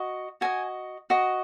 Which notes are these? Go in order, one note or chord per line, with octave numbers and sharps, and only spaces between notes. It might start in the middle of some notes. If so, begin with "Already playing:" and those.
Already playing: F#4 D#5
F#4 D#5 G#5
F#4 D#5